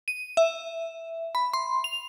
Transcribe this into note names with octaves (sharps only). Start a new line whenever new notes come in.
D#7
E5
B5
C6
F7